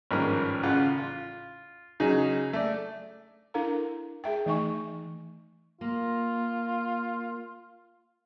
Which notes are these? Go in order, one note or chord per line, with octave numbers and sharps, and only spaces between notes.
G#1 G2 F3 C#4 A#4 F6
A1 C#3 F4 F#5
F4
C#3 F#3 D#4 G#4
A3 D5
D4 E4 A4 A#4 F5 A#5
G#4 E5 G5
E3 A3 D#4 E5 G#5 C#6
A#3 F4